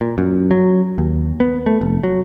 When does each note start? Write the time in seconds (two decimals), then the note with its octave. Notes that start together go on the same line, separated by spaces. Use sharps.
0.01 A#2
0.18 F#2
0.51 F#3
0.98 D#2
1.40 B3
1.66 A3
1.81 F1
2.03 F#3